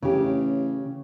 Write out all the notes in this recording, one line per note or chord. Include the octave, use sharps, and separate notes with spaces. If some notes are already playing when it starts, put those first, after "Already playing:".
A1 C#3 G4